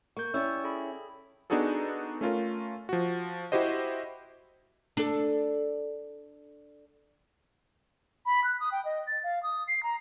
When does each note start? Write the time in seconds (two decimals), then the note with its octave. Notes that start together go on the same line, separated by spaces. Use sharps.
0.17 A#3 C#6 G6
0.34 C#4 E4 G4 D5 C#6 E6
0.64 G#4 A4 B5
1.50 B3 D4 D#4 F#4 G#4 A4
2.21 A3 C#4 F4 A#4
2.89 F3 F#4
3.52 E4 F#4 G4 C5 D#5
4.97 D4 A4
8.26 B5
8.44 F#6
8.60 D#6
8.72 G5
8.85 D#5
9.07 A6
9.24 F5
9.43 D#6
9.68 C7
9.83 A#5